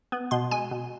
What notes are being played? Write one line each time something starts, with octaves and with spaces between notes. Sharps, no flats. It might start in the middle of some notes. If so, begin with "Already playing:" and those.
B3
B2 C6
G#3 G#5
B2